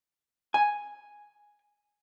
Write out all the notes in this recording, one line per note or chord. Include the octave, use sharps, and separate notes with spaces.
G#5